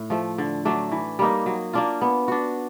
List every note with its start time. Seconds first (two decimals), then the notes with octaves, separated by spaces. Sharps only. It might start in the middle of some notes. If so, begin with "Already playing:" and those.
Already playing: A2
0.10 F3 A3
0.38 D3
0.65 F#3 A3 D4
0.92 E3
1.19 G3 A#3 D#4
1.46 F#3
1.73 A#3 D4 F4
2.01 B3
2.28 D4 F#4